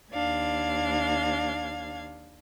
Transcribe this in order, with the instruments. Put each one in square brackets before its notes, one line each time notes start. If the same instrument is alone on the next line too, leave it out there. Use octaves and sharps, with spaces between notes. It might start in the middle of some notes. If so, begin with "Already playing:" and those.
[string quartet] D#2 D4 F5 G#6